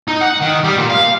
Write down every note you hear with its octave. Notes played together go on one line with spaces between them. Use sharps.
D#4
F#5
D#3
G3
A#2
F5